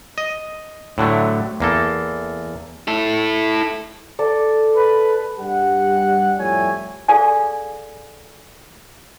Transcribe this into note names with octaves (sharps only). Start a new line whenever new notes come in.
D#5
A2 D3 F#3 A3
E2 A#3 A4
E4 A4
A4 D5
B4
G2 G3 G4 F#5
F2 A2 G3 C#5 E5 G#5
G#4 A4 D5 F5 G#5